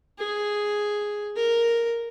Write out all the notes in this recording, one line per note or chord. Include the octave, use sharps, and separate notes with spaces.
G#4
A#4